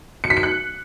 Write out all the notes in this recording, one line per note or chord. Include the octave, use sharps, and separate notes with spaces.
C#7
B6
C#7
F#6